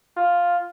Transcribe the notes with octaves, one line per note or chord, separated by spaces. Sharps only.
F4